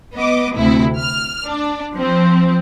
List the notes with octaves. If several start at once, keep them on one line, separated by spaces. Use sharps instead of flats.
B3 D#5 D6
D2 C3 E4
F6
D4
F3 C4